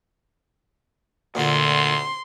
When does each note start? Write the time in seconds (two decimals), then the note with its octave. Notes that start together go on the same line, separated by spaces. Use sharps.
1.35 D2 A#2 D3 F4 C6